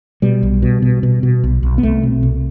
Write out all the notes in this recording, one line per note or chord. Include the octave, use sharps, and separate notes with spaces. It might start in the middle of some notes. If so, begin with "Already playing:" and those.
B2 G3
B1
B2
B2
B2
B2
B1
B1
B3
C2 A3
B2 C4
C2